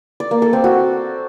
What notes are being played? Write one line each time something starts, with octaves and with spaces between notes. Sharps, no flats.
D5
A#3
A4
C4
F#4